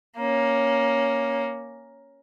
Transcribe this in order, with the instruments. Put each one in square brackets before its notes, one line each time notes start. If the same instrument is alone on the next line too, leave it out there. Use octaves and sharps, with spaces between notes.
[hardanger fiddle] A#3 C#4